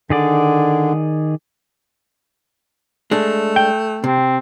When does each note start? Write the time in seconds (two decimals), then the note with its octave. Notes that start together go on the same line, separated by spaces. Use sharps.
0.10 D3 D#3 G#4 D5
3.11 G#3 A3 D4
3.56 G5
4.04 C3 C4